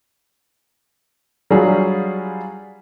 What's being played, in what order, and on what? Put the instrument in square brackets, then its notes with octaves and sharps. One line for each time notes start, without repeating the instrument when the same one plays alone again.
[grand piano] F#3 G3 D4 F4 F#4 G#4